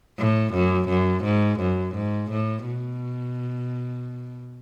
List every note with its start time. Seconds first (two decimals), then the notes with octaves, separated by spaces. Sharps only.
0.19 A2
0.54 F#2
0.89 F#2
1.24 G#2
1.60 F#2
1.95 G#2
2.31 A2
2.66 B2